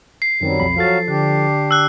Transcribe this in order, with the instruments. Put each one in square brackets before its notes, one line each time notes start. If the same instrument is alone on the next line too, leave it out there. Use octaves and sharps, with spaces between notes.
[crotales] C7
[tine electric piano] F#2 D#3 C4 [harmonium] F#3 G3
[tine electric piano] B1 F2 B5
[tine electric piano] F3 A4 A6 [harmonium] F#3 F#4 F5
[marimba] D3 [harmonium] D4 G4
[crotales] E6 F#6